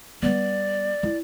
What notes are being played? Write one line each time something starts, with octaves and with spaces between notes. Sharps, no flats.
G3 B3 D5
E4